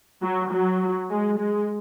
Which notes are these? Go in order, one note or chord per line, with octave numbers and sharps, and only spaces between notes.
F#3
F#3
G#3
G#3